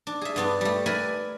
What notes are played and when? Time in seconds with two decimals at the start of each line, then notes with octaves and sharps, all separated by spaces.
0.07 D4
0.21 G#4 E5
0.36 G2 B3 D4
0.61 G3 A3
0.86 A#4 B4 D5 E5 G#5